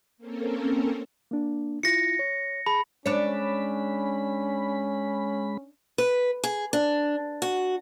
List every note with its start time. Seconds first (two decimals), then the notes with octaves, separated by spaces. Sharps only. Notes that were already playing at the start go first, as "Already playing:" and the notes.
0.17 A#3 C4 C#4 A4 A#4
1.31 A#3 D4
1.83 E4 F4 A#6 C#7
2.19 C#5
2.66 G#4 A5 B5
3.06 G#3 C#4 D4 C#5 B5
5.98 B4
6.44 G#4
6.73 D4
7.42 F#4